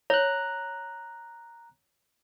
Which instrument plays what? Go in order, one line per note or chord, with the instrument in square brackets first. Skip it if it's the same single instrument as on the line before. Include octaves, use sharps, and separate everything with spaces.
[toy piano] C#5 [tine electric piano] A#5 F#6